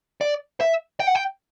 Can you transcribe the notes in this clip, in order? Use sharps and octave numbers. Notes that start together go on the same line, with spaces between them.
D5
E5
G5
F#5
G5